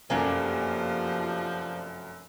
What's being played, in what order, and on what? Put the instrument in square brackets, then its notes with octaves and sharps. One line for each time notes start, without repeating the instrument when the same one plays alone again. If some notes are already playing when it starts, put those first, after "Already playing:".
[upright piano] F1 F#2 G#5 [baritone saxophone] F3 [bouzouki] A#3 D4 G4